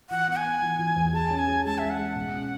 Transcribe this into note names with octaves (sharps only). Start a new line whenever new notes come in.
E3 F#5
B3 F#5
G#5
B3
E3
E3
E2
G#4 A5
C#4
G#5
G#4
G#3 A5
G#4 E5
F#5
G#3
B2
C#4